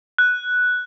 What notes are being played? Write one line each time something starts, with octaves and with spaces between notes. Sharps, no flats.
F#6